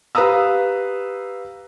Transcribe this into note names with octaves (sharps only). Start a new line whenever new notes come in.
G4 B4 F5 A#5 D#6 E6